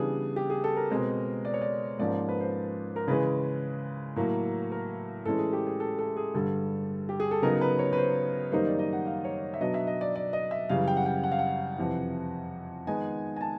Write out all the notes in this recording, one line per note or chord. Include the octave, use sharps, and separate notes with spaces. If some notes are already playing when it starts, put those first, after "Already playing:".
Already playing: C#3 E3 G3 B3 D4 G#4
G4
G#4
A4
A#4
B2 G#3 C4
D5
C#5
D5
G#2 F3 A#3 C#4 D5
D5
B4
C5
A#4
C#3 E3 G#3 C#4 B4
A2 F#3 A#3
A#4
A2 E3 G#3 C#4 A4
G#4
G4
G#4
A4
A4
G#4
G2 D3 G3 A4
G4
G#4
A4
C#3 F#3 B3 D#4 A#4
B4
C#5
B4
C5
F#2 D#3 G3 A#3 D#4 C5
D5
D#5
F#5
F5
C#5
E5
B2 F#3 B3 D4 D#5
E5
D#5
D5
D5
D#5
E5
F#2 C#3 E3 G3 F5
G5
F#5
G5
F#5
F5
F#5
F2 C3 E3
D#3 G#3 B3 D#4 G#5
G#5
A5